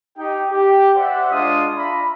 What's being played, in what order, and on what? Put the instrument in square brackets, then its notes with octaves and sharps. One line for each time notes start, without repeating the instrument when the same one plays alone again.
[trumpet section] D#4 G4 G5
G4
C5 D5 E5 F#5
G#3 D4 F4 F5 C6 D#6
D4 F4 E5 A#5 B5